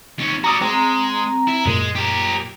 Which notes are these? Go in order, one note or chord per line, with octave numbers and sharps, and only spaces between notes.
D#2 C#4
F#4 D5 A#5 D#6 E6
G#3 C4 A#5
E4
F#2 A#2 G#3
G4 A#4